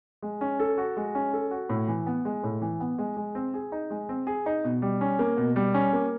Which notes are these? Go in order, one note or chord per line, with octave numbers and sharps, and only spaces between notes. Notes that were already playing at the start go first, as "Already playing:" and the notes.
G#3
C#4
A4
F#4
G#3
C#4
A4
F#4
A2
E3
B3
G#3
A2
E3
B3
G#3
G#3
C4
G#4
D#4
G#3
C4
G#4
D#4
B2
G3
C#4
A#3
B2
G3
C#4
A#3